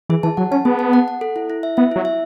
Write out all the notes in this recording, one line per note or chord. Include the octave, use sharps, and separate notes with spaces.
E3 G#4
E3 A5
F#3 F#5
C#4 A5
B3 G#4
A5
F#5
F#5
A4
E4
E4
E5
B3 E5
F#3 E4
E5